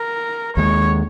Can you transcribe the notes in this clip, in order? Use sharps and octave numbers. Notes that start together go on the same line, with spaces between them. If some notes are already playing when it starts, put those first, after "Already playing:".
Already playing: A#4
D#2 D#3 G#3 C#5